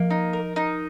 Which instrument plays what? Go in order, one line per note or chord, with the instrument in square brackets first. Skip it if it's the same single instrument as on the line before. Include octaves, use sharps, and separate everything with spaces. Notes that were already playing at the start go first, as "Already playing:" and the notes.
Already playing: [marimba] F3 [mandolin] A#3
[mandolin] D#4
A#4
D#4